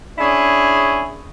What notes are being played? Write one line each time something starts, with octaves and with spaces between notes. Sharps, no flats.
C#4 D4 E4 G#4